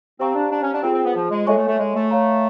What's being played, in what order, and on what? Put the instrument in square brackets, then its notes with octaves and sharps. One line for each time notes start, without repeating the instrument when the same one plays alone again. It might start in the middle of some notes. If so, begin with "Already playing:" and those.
[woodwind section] C4 [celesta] G4 C5 F5 A#5 C#6
[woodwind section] D4
D4
C#4
D4
[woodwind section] C4 [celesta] F4 G#4 C5
[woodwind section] C4
B3
F3
G#3
[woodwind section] G#3 [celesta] A4 C#5 E5 G#5 C#6
[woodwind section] A3
A3
G#3
A3
[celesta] C#5 F5 A#5